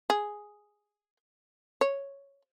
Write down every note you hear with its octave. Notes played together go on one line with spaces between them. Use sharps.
G#4
C#5